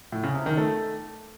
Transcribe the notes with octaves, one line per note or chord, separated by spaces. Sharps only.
A2
C#3
C3
D#3
A3